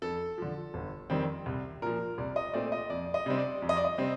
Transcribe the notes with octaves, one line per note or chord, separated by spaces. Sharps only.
F2 A4
D3 F3
G1
F2 D#3 G3 C4
C2
A#2 F3 A#4
C2 D5
D#5
A#2 A3 C4 D5
D#5
F2 D5
D#5
C3 G3 C4
D5
F2
D#5
D5
D#5
C3 G3 C4